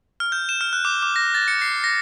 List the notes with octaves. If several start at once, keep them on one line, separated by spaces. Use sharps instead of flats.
F6
G6
E7
F6
F#6
D6
D6
A#6
A6
C#7
C7
A#6